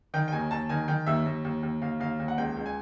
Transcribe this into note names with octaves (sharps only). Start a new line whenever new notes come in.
D#3 G5
G5
D#2 G#5
D#2 A5
D#3 G#5
D#3 G5
D#2 E5
D#2
D#2
D#2
D#2 F5
D#2 F5
D#2
F#5
C#2 G5
C#2
G#5